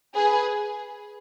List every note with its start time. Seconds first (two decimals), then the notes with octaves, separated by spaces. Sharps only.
0.16 G#4 B4